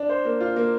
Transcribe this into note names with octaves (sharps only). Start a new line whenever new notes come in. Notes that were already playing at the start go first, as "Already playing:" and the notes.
Already playing: D4
C5
A#3
F4
A#3